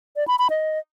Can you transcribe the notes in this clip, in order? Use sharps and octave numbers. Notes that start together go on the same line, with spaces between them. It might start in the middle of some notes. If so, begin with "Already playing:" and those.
D5
B5
B5
D#5